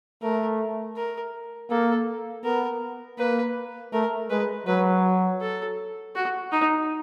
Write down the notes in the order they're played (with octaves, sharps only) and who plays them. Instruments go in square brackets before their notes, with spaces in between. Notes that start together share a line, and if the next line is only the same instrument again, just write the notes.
[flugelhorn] A3 [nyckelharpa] A#4
[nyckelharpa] A#4
[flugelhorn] A#3 [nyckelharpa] A4
[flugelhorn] B3 [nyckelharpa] A#4
[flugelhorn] A#3 [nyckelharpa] B4
[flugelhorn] A3 [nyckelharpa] A#4
[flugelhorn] G#3 [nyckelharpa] B4
[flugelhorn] F#3 [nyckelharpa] B4
[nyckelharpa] A4
F#4
D#4